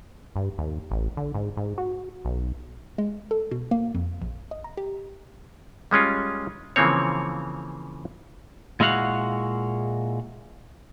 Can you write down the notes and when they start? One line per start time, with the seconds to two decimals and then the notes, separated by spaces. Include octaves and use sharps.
0.36 G2
0.58 D#2
0.91 A1
1.17 D3
1.34 G#2
1.57 G#2
1.78 F#4
2.25 B1
2.98 G#3
3.31 A4
3.51 B2
3.71 A#3
3.95 F2
4.22 A#1
4.51 D#5
4.64 A#5
4.77 G4
5.91 G3 G#3 C#4 F4
6.76 C#3 E3 F3 A#3 C4 C#5
8.80 A#2 G#3 E4 F#4 F5 F#5